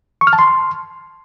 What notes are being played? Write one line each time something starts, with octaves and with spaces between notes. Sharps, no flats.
C#6
F6
A5
C6